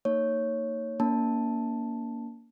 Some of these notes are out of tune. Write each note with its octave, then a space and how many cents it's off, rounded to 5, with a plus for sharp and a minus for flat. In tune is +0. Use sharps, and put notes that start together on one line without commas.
A#3 -35 D#4 +0 C#5 +0
A#3 +0 C#4 +45 A5 +0